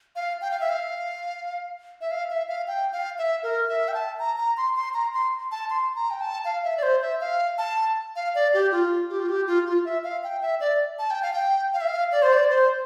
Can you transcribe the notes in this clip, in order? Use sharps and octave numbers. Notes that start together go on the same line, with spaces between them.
F5
G5
F5
E5
F5
E5
F5
E5
F5
G5
F5
E5
A#4
E5
G5
A5
A#5
A#5
C6
C6
A#5
C6
A5
C6
A#5
G5
A5
F5
E5
D5
C5
E5
F5
A5
F5
D5
G4
F4
G4
F4
G4
F4
F4
E5
F5
G5
E5
D5
A5
G5
F5
G5
F5
E5
F5
D5
C5
D5
C5